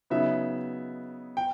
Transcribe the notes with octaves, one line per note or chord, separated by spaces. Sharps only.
C#3 F#3 B3 D#4 E5
G5